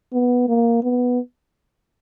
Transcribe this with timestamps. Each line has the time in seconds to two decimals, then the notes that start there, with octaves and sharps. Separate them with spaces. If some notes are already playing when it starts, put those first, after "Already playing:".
0.13 B3
0.48 A#3
0.83 B3